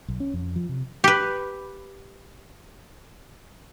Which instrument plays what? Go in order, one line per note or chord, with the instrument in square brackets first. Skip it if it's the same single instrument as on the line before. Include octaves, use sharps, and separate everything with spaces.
[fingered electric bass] B1
C#4
F2
F3
C3
[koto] G4 B4